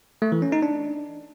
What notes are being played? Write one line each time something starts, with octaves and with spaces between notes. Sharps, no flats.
A3
E3
C#4
D#4
D4